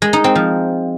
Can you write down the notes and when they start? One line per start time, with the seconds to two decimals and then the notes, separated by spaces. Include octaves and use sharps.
0.02 G#3
0.13 D#4
0.24 C4
0.35 F3